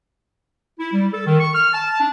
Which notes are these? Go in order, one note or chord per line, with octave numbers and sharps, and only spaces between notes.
E4
G3
A4
D#3
C#6
F6
A5
D4